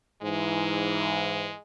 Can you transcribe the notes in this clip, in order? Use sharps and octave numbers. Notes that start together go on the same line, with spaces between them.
G#2 E3 G#3